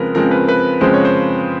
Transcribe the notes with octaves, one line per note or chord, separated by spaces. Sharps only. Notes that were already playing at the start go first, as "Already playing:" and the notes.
Already playing: C#3 F3 G#3 C4 A#4 B4
C#3 F3 G#3 C4 A#4
B4
B4
C#3 F3 G#3 C4 C5
C#5
C5